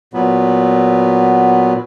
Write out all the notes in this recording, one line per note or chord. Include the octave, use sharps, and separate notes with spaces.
A#2 F#3 B3